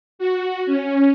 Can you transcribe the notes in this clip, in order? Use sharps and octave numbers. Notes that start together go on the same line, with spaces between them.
F#4
C#4